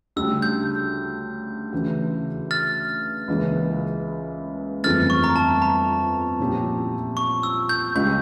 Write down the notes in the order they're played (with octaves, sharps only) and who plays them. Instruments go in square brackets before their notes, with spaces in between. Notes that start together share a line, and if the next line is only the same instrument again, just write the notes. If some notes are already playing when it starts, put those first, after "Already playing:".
[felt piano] D2 C#3 G3 D4 [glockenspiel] E6
[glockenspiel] G6
[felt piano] D2 C#3 E3
[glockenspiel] F6 A6
[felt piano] C#2 C#3 E3 A#3
[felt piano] G1 F2 E3 A3 E4 [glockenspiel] F6 A6
[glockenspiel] C#6
A#5
A5
A#5
[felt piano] A#2 F3 C#4 E4 G4
[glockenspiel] C#6
E6
G6
[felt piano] C#2 C#3 G3 [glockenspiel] G6